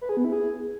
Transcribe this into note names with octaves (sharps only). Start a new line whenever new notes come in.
B4
G#4
B3
E4
G#4